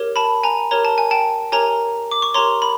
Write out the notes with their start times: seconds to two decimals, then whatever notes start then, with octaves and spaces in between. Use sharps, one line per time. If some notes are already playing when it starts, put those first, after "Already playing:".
Already playing: G4 A#4 C#5
0.16 A5 B5
0.43 G#5 A#5
0.71 G4 A#4 C#5 A#5
0.85 A5
0.98 G#5
1.11 G5 A5
1.52 G4 A#4 C#5 G#5 A#5
2.11 D6
2.22 C#6
2.34 G4 A#4 C#5 A#5 C6
2.62 B5